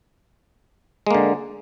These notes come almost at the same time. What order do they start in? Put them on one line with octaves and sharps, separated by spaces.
G#3 A#3 D3